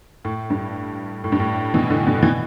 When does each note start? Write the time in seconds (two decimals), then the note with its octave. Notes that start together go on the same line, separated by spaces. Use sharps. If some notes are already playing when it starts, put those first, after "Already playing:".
0.25 A2
0.50 G2
1.24 A2
1.32 G2
1.40 A2
1.74 B2 E3
1.90 A2 D3
2.06 G2 B2
2.23 B2 E3